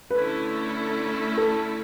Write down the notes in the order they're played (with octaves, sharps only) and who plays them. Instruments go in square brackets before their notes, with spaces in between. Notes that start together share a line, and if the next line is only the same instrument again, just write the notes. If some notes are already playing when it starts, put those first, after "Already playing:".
[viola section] D3 A3 C#4 E4 [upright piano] B4
[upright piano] A4